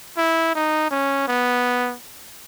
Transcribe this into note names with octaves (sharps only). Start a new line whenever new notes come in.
E4
D#4
C#4
B3